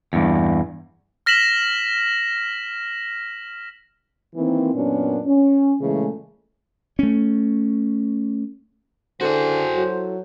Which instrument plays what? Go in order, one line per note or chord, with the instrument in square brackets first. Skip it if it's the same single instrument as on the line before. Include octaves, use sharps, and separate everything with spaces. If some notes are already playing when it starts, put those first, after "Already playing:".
[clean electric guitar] E2 G2
[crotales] F6 A#6 B6 E7 F#7
[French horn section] D#3 E3 A#3 C4
F#2 A#2 B3 C#4 D4
C#4
A#2 C#3 E3 G#3 A3
[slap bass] A3 C#4
[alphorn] D3 [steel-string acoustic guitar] E4 A4 E5 [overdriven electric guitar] F#4 G#4 [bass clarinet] C5
[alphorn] F#3